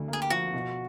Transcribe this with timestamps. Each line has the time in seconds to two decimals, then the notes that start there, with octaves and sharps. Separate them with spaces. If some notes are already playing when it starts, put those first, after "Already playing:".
Already playing: D2 D3
0.08 A#3 G#4
0.22 G4
0.30 F3 F#4
0.54 B2